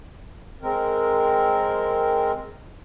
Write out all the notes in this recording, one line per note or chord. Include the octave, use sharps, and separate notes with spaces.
G#3 C4 A#4